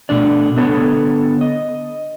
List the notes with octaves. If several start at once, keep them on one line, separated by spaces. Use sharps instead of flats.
B2 A3 D4 D5
D3 B3 A4 C#5
D#5